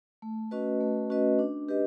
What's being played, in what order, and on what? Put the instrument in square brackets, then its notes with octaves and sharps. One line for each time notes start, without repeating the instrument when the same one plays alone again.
[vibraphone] A3
C#4 F#4 B4 D#5
A3
C#4 F#4 B4 D#5
D4
G4 B4 D#5